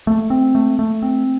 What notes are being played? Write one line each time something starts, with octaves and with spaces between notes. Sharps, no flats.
A3
C4
A3
A3
C4